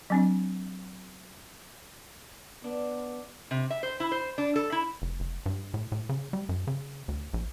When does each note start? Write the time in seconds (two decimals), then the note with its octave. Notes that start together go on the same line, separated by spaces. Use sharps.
0.10 F#3 C4 D4
2.64 B3 D4
3.51 C3
3.70 E5
3.83 C5
4.00 E4
4.12 C5
4.38 D4
4.56 A4
4.72 E4
5.02 F1
5.20 F1
5.46 G2
5.74 A2
5.92 A2
6.09 C#3
6.33 G3
6.49 F#2
6.67 C#3
7.08 D2
7.34 A#1